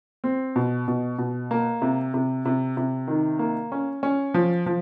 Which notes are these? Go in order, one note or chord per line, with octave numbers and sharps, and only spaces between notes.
C4
B2
B2
B2
A#3
C3
C3
C3
C3
D#3
A#3
C#4
C#4
F3
F3